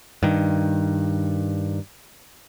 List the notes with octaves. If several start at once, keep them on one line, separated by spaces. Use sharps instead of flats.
G2 D#3